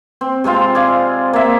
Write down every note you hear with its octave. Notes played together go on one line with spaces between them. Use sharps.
C4
C3 G#3 C4 F4
G#4 D5 F5
A#3 E5